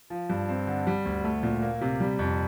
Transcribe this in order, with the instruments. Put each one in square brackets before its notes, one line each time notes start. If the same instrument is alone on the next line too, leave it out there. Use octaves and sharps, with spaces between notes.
[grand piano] F3
G2
C4
D3
G3
D2
A3
A#2
A#3
C3
G3
F2